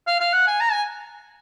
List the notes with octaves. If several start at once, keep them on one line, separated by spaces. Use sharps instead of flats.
F5
F5
F#5
G#5
A#5
G#5